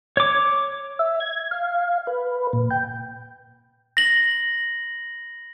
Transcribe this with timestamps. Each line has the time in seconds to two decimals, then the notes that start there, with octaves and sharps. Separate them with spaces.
0.17 C#5 D6
0.99 E5
1.20 G#6
1.51 F5
2.07 B4
2.53 A#2
2.71 G5
3.97 A#6 F#7